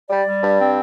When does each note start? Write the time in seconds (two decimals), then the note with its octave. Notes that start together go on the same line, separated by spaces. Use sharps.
0.10 G3 D5
0.26 G3
0.42 G2
0.59 C4